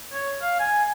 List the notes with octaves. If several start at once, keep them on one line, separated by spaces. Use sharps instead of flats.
C#5
F5
G#5